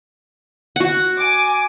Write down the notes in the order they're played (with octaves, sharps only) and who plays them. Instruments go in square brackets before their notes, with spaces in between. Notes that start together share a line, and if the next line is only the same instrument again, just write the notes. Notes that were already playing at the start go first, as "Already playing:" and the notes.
[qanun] F#4 F#5
[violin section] G#5 D6